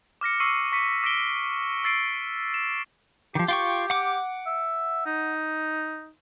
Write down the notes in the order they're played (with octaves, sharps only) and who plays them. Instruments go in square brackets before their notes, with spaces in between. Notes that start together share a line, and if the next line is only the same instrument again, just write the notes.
[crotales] D6 F6 A#6 C#7
C#6 E6 C7 D#7
C#6 B6 C#7
D6 A#6 B6 D7 G7
E6 A6 C7 D7
E7
[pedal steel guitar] D#3 F3 [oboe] G4
[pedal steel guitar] F4 G5 C#6 [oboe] G4
[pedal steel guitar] F#5 D6
[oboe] E5
D#4